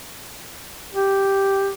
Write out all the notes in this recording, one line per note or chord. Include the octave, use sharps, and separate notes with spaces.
G4